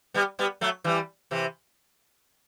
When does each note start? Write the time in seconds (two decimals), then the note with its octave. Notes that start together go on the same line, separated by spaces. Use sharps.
0.14 G3 B3
0.39 G3 B3
0.61 F#3 A3
0.84 E3 G3
1.31 C3 E3